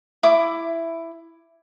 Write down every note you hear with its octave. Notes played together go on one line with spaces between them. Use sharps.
E4 D6